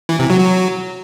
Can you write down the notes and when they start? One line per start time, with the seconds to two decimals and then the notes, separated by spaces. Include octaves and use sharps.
0.09 E3
0.19 C3
0.30 F#3
0.40 F#3